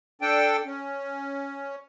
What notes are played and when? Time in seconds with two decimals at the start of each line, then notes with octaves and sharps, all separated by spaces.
0.22 D4 A4 G5
0.65 C#4